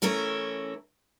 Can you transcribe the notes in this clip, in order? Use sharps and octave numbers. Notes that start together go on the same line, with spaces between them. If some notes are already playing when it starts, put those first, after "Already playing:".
E3 A3 C#4 E4 A#4